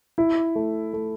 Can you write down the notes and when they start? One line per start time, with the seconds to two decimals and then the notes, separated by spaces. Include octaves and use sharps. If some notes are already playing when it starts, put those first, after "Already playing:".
0.18 E4
0.55 A3
0.93 A3